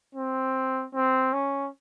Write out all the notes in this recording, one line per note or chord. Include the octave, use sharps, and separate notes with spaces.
C4
C4
C#4